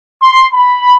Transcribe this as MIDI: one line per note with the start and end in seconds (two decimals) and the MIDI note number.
0.22 0.45 84
0.53 0.96 83